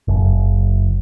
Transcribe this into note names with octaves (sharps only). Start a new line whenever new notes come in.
F#1